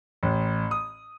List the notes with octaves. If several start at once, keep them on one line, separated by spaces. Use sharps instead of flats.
A1
D#6